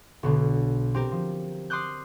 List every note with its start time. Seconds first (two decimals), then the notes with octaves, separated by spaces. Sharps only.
0.23 B1 B2 D3
0.94 C4 G4 A#4
1.12 F3
1.70 C6 D6 D#6 F#6 G6